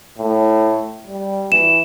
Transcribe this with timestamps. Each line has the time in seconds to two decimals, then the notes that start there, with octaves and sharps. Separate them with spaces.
0.18 A2
1.07 G3
1.52 E3 E7